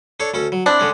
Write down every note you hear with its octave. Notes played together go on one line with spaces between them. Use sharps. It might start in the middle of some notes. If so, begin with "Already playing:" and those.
D4 A4 C#5
D2 C#4 A4
F#3
C4 D4 E4
D3 G#3 C#4